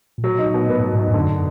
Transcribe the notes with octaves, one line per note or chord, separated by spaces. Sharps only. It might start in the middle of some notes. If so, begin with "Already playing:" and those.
A#2
B2 F#3
D#4
A#2
B2
A2 B3
G#2
F#3
G#2
D#4
F2
F#2 D3